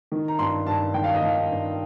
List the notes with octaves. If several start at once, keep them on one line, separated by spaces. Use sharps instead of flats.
D#3
A#5
G2 C6
G2 A5
D#3 G5
F5
D#5
D#3 F5
G2